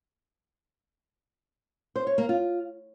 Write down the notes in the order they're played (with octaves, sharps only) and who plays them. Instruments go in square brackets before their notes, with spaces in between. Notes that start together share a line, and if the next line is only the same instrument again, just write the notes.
[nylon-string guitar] C5
C#5
A#3
F4